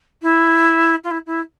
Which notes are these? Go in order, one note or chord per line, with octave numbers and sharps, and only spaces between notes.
E4
F4
E4
E4